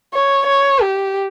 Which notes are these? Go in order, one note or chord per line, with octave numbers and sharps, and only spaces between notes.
C#5
C#5
G4